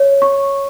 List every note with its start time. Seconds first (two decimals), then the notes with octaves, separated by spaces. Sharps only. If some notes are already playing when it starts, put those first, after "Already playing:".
Already playing: C#5
0.22 C#6